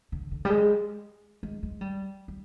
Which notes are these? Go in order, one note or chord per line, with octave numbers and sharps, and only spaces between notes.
D3
D3
G3
G#3
G#3
G#3
G3
G3